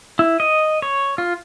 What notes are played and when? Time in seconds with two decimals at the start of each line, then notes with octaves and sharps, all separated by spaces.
0.19 E4
0.40 D#5
0.82 C#5
1.18 F4